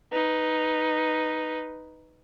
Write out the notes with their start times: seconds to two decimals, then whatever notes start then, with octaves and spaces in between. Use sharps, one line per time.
0.12 D#4 B4